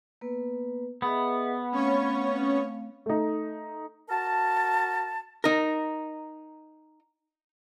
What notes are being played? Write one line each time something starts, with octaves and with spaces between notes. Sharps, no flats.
A#3 B3 B4
B3 G#4 D#5 E5
A3 C4 C#4 C#5 F5 C#6
A3 D#4
F#4 A#4 A5
D#4 A#4